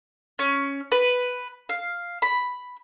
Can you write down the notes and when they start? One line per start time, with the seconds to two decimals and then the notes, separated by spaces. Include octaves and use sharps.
0.39 C#4
0.92 B4
1.69 F5
2.22 B5